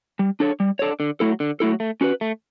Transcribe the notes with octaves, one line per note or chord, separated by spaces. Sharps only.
G3
D4 A4 C#5
G3
D4 A4 C#5
D3
F#3 A3 E4 A4
D3
F#3 A3 E4 A4
A3
C#4 F#4 B4
A3